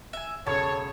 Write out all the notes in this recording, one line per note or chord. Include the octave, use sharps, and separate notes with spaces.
E5 G#5
E1 C#3 A4 C#5 A5